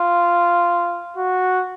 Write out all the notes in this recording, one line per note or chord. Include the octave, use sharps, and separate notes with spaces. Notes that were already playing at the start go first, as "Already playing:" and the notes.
Already playing: F4
F#4